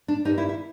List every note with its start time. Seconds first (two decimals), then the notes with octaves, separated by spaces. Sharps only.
0.08 D4
0.25 G2 D#3 G3 D#4
0.38 E4
0.49 E4